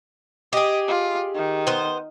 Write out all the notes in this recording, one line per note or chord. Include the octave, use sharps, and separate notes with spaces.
G4 G#4 D#5
F4
D#3
B3 C5